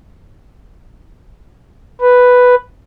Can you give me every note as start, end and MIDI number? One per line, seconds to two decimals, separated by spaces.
2.01 2.55 71